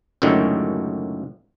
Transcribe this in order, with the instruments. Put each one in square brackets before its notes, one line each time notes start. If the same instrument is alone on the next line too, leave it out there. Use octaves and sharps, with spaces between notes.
[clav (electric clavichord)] C#2 F#2 A2 D3 D#3